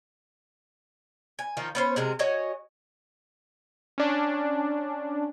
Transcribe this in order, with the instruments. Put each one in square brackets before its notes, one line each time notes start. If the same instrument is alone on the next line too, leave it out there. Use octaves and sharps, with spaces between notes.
[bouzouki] G#5
D#3 F3 D#4 F4
B3 C#4 C5
C3 G#3 A#4
F#4 C#5 D#5 G#5
[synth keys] C#4 D4